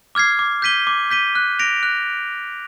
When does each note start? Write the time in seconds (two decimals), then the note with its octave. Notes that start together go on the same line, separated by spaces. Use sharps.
0.15 D6 F6 G#6 C7
0.39 D6
0.62 G6 B6 D#7 G7
0.87 D6
1.10 G6 B6 D#7 G7
1.35 F#6
1.59 A#6 D7 F7
1.83 F#6